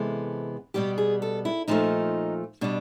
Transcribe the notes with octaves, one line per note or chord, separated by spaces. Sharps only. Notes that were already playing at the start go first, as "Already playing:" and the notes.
Already playing: C3 E3 G#3 B3 A4
B2 G3 B3 G4
G#4
A4
E4
A#2 F3 A3 D#4
B2 G3 D4